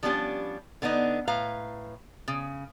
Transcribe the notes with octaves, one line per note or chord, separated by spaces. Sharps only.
F3 G3 B3 C#4 D4 G4
D3 B3 D4 D#4
A2 B4 F5 A#5
C#3